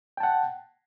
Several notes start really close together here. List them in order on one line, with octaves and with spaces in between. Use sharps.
G5 A5 F#5